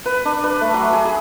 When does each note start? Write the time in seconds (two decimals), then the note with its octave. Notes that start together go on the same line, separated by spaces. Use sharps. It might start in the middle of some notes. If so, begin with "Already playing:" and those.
0.06 B4
0.25 D4
0.44 B4
0.61 A3
0.74 F#3
0.93 G#4
1.05 G#4